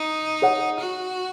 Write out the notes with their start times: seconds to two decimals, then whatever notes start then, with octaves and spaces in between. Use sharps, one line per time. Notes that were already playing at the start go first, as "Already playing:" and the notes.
Already playing: D#4
0.42 G#4 C#5 F#5
0.81 F#4